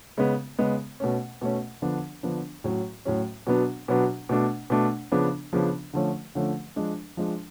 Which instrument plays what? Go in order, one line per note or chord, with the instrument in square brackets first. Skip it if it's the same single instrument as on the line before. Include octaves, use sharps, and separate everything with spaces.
[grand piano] C#3 G#3 B3
C#3 G#3 B3
B2 A3 C#4
B2 A3 C#4
D3 F3 B3 D4
D3 F3 B3 D4
A2 F#3 C#4
A2 F#3 C#4
B2 F#3 B3 D4
B2 F#3 B3 D4
B2 A3 D4
B2 A3 D4
C#3 F3 B3 D4
C#3 F3 B3 D4
D3 F3 A3 C#4
D3 F3 A3 C#4
F3 G#3 D4
F3 G#3 D4